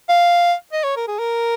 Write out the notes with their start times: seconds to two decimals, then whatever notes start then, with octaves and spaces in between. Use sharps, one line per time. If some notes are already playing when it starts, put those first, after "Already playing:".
0.09 F5
0.73 D#5
0.84 C#5
0.96 A#4
1.08 G#4
1.19 A#4